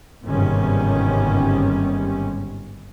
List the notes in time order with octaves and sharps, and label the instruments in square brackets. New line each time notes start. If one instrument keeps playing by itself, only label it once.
[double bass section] G1 G#2 C3 D#3 G3 C#4